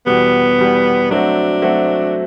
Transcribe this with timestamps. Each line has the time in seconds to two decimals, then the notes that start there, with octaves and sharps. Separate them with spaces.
0.06 E2 B2 G3 B3
0.58 E2 B2 G3
1.10 F#3 A3 C4 D4 F#4
1.62 F#3 A3 C4 F#4